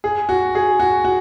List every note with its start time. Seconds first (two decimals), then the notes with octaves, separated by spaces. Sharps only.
0.04 G#4
0.29 F#4
0.55 G#4
0.80 F#4
1.05 F#4